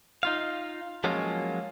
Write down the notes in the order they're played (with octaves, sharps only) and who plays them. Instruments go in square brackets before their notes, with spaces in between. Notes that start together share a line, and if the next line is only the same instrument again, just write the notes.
[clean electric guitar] D#4 F4 F5
F3 F#3 G#3 A#3 C#4 F4